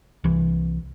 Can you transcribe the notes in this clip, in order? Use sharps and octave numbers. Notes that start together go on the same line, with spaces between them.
C2 E3